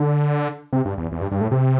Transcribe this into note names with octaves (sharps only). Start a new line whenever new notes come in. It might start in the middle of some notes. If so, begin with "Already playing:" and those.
Already playing: D3
C3
G2
E2
E2
G2
G2
A2
C3